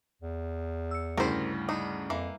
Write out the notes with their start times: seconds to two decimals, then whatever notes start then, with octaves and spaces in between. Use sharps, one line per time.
0.22 E2
0.91 E6 C#7
1.17 D2 G2 C#3 G3 E4 A#4 C5
1.69 D4 D#4
2.10 F2 E3 A#3